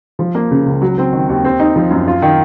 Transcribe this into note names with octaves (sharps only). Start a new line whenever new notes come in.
F3
A#3
C#3
C#2
F#3
C4
D#3
D#2
C4
D#4
F3
F#2
F4
D#3